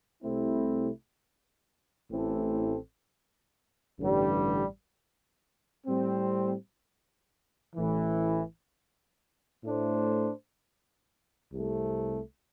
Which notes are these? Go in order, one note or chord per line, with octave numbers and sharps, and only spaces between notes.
C2 C3 A3 C4 E4
A1 A2 E3 C4 A4
A1 G2 D3 G3
A2 G3 C4
A1 A2 E3
A2 A3 D4 C5
C2 C3 A3